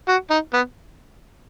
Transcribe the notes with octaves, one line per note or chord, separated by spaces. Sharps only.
F#4
D#4
B3